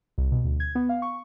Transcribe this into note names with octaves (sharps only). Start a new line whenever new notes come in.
C2
B2
D2
G#6
B3
F5
C#6